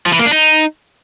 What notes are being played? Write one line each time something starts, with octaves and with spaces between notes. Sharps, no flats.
F3
E3
A#3
D4
D#4